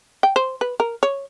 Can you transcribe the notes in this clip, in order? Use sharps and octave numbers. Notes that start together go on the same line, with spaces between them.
G5
C5
B4
A#4
C#5